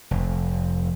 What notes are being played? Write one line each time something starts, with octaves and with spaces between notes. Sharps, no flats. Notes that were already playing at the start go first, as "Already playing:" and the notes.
F1